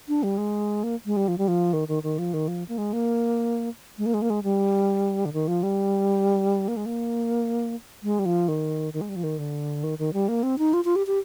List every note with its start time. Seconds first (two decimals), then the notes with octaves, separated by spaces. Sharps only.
0.08 D4
0.23 G3
0.38 G#3
0.83 A#3
1.06 G#3
1.17 G3
1.28 F3
1.38 G3
1.48 F3
1.73 D#3
1.88 D#3
2.03 D#3
2.19 F3
2.34 D#3
2.48 F3
2.68 A#3
2.78 G#3
2.93 A#3
3.98 G#3
4.06 A#3
4.14 G#3
4.22 A#3
4.30 G#3
4.43 G3
5.25 D3
5.33 D#3
5.48 F3
5.63 G3
6.68 A#3
6.77 G#3
6.86 A#3
8.03 G#3
8.19 G3
8.25 F3
8.48 D#3
8.93 D#3
9.01 G#3
9.09 G3
9.16 F3
9.23 D#3
9.38 D3
9.84 D#3
9.99 D#3
10.13 G3
10.28 A#3
10.43 C4
10.58 D#4
10.73 F4
10.85 F4
10.96 G4
11.07 G4